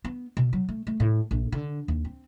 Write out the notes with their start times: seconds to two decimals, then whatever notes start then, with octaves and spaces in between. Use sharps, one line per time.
0.05 B3
0.37 B2
0.53 F#3
0.69 A3
0.87 A3
1.00 A2
1.31 A#1
1.52 D3
1.88 D#2
2.05 C4